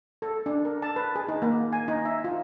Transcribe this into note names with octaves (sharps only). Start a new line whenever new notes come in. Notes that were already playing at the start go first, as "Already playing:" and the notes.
A4
D4
A#4
A5
B4
G#4
D#4
A#3
G#5
D#4
E5
F4